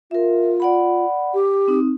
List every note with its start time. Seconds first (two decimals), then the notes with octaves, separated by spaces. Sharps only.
0.11 F4 A#4 E5
0.60 D5 F#5 B5
1.34 G4
1.68 C4 D#4